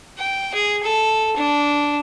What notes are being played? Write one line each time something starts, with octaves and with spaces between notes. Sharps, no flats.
G5
G#4
A4
D4